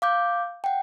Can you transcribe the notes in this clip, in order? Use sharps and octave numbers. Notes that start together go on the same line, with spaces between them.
F5 D6 G6
F#5 G5